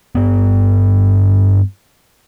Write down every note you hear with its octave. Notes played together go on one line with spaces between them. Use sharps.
G2 B3